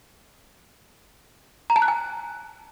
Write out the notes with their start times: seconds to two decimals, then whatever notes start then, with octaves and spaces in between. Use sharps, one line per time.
1.70 A#5
1.76 A5
1.82 F#6
1.88 G#5